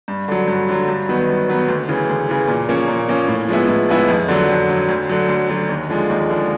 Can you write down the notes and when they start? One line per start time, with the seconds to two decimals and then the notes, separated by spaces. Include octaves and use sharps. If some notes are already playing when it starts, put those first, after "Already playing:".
0.08 G2
0.28 D3 F#3
0.48 G2
0.69 D3 F#3
0.88 G2
1.09 D#3 F#3 B3
1.29 G2
1.49 D#3 F#3 B3
1.68 D2
1.89 C#3 E3
2.09 D2
2.29 C#3 E3
2.48 A#2
2.69 F3 A#3 C#4
2.88 A#2
3.08 F3 A#3 C#4
3.28 A2
3.48 F3 G#3 B3 E4
3.68 A2
3.89 F3 G#3 B3 E4
4.09 F2
4.28 D3 F#3
4.49 F2
4.69 D3 F#3
4.88 D2
5.09 D3 F#3
5.29 D2
5.49 D3 F#3
5.69 D#2
5.90 D3 F3 G#3
6.10 D#2
6.29 D3 F3 G#3